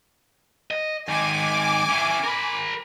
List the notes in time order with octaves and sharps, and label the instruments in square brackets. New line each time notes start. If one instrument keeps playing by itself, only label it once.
[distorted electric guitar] D#5
[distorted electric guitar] D#3 G#3 [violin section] G#5 D6
[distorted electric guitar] C#4 E4
A#4 B5